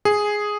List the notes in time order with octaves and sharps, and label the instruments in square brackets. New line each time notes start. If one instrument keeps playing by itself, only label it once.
[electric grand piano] G#4